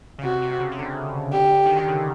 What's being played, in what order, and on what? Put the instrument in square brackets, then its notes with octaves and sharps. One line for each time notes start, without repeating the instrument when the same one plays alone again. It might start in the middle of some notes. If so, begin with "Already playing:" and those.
[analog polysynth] C#3
[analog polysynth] C3 [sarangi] F#4
[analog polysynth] C3
C#3
C#3
D3
[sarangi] G4
[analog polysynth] D#3
D3
C#3